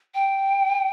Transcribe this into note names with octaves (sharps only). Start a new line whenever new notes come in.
G5